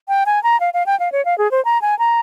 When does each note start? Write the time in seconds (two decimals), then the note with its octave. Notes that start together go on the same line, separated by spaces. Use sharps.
0.08 G5
0.26 G#5
0.43 A#5
0.60 F5
0.74 F5
0.86 G5
1.00 F5
1.12 C#5
1.25 F5
1.38 G#4
1.51 C5
1.65 A#5
1.82 G#5
1.99 A#5